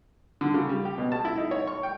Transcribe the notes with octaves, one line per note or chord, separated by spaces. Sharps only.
D3
C#3
G3
G4
B2
A5
E4
D#4
C#5
C#6
G5